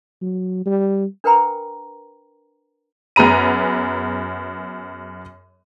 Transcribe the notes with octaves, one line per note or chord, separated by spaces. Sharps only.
F#3
G3
D4 A#4 B4 G5 A#5 B5
F#2 B3 G#4 A#5 D#7